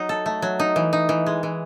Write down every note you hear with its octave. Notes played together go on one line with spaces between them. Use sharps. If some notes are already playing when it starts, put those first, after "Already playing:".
Already playing: F#3 D#4
A4
A3
F#3
D#4
E3
D#4
E3
G#3
E3